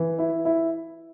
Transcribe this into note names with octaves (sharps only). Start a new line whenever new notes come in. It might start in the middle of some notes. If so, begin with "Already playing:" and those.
Already playing: E3
E4
E4